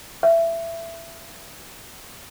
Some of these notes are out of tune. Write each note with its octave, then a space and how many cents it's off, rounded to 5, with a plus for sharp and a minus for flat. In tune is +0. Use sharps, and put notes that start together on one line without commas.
E5 +15